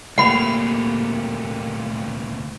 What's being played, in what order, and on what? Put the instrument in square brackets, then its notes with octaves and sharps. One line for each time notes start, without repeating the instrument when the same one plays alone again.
[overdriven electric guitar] D2 A#2 [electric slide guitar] A3 A#3 G4 [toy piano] F#5 B5